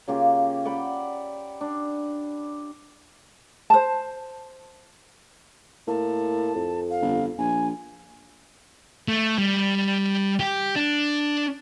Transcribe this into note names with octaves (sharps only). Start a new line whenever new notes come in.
C#3 A#3 F4 G4
D5 F#5 G5 B5
D4
C5 A5
A2 A#3 A5
F2
F5
G1
A#1 G#5
A3
G3
G4
D4